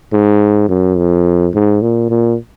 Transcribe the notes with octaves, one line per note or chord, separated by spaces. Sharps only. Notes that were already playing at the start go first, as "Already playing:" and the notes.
G#2
F#2
F2
G#2
A#2
A#2